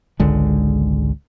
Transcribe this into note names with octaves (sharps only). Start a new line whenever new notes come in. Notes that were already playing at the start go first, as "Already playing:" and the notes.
G#1 C#2 D3 G#3